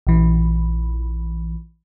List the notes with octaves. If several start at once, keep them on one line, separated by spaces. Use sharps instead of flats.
A#1 E3